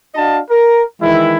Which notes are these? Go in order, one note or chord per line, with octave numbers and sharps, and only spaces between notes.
D4 F#4 D#5 F5 A5
A#4
D#3 E3 G#3 E4